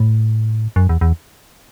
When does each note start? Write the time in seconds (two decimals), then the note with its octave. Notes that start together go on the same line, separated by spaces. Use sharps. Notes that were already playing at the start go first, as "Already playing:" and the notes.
Already playing: A2
0.76 F#2
0.89 E2
1.01 E2